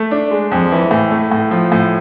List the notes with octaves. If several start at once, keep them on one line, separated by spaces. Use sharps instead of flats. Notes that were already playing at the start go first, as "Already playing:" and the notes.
Already playing: A3
D4
G#3
F2
E3
A2
A3
A2
F3
A2